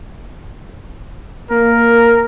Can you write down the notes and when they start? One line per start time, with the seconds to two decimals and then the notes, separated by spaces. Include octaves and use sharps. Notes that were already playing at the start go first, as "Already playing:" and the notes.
1.51 A#3 A#4